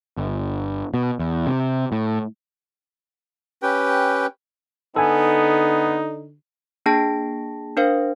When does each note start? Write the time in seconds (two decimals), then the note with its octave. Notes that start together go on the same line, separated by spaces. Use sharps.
0.17 G1
0.94 B2
1.19 E2
1.47 C3
1.92 A2
3.62 C#4 G4 B4 G5
4.96 D3 B3 D#4 A4 G#5
6.86 A#3 D4 G#4 G5 A5 A#6
7.77 D4 A#4 C5 F5